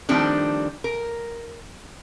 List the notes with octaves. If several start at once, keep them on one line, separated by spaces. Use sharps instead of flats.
D#3 F3 G3 A3 C4 D4
A#4